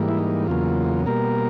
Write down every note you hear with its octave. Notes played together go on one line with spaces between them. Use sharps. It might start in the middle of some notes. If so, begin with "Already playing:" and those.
Already playing: G#2 E3 G3 A#3
E4
D#4
E2 C#3 F#3 A#3 F4
B2 G3 A#3 A#4